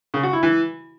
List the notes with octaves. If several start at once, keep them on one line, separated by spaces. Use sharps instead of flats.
C#3
F#4
E4
E3